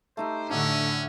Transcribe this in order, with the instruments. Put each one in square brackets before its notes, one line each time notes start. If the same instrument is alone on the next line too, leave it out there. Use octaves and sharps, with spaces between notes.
[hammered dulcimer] A3 D#4 G4 [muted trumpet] C5
[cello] A2 D3 [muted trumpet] C#4 [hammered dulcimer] D4 F#4 E5